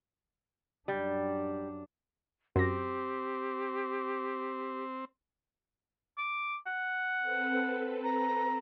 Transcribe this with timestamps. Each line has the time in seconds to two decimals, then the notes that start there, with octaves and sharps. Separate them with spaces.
0.88 F#2 G3 D4
2.56 F#2 C4 G4 A#6
6.18 D6
6.67 F#5
7.20 C4 A4 B4
8.04 A#5